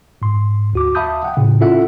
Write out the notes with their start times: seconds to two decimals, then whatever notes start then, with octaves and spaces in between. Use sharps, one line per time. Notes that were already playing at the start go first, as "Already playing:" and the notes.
0.22 G#2 C6
0.73 D2 F#4 D6
0.95 E5 F5 A5 B5 D#6 G6
1.24 F#5 G5
1.37 A2 C#3
1.60 C#4 E4 F4 A4 E5 F#5